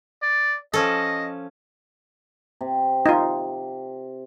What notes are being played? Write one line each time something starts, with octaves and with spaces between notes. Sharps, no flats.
D5
F3 C#4 A4 D#5
C3
D#4 F4